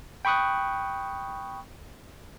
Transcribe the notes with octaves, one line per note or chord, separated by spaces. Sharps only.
G5 B5 C#6 D#6 F#6